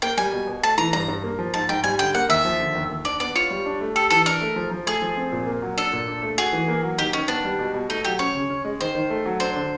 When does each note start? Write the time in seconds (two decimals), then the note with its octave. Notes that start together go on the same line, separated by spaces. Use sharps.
0.02 A#3 G5
0.17 G3 G#5
0.32 B2
0.48 B2
0.63 A3 A5
0.78 E3 A#5
0.93 G2 A#5
1.08 G2
1.24 A#3
1.39 F3
1.54 G#2 A5
1.69 G#2 G5
1.84 G3 G#5
1.99 D3 G5
2.14 A#3 F#5
2.29 D#2 E5
2.45 F3
2.60 D3
2.75 D#2
2.89 D#2
3.05 D4 D5
3.20 B3 D5
3.35 F4 C#5
3.51 G3
3.66 D4
3.81 A3
3.95 G4 A4
4.11 E3 A4
4.26 D4 A#4
4.41 A3
4.56 F3
4.71 F3
4.87 A3 G#4
5.02 F3
5.17 C4
5.32 A#2
5.47 A#3
5.62 F#3
5.77 D4 A4
5.93 A#2
6.08 D4
6.23 A3
6.38 F#4 G#4
6.53 E3
6.68 A#3
6.83 F#3
6.98 D#3 G4
7.13 D#3 C#4
7.28 B3 D4
7.44 G3
7.59 B2
7.74 B2
7.89 A3 D#4
8.05 F#3 G4
8.19 C#4 C#5
8.35 C#3
8.50 C#4
8.65 G#3
8.80 D#3 C5
8.95 D#3
9.10 A3
9.26 F#3
9.40 D4 C5
9.56 D3